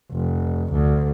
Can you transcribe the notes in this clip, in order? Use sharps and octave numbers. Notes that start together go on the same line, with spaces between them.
F1
D2